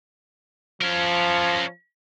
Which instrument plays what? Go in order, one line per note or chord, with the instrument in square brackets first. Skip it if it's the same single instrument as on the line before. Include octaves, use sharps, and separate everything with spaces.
[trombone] F3 [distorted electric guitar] C#4 A#4